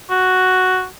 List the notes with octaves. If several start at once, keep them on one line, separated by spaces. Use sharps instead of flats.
F#4